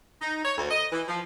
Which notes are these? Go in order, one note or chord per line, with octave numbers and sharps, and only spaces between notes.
D#4
C#5
D2
D#5
E3
F3